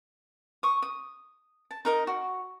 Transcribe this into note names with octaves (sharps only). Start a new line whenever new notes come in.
C#6 D#6
D#6
A5
D#4 A#4 D#5
F#4